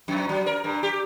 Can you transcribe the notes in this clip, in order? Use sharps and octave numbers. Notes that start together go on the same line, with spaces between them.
F2
F#3
A#4
G2
G4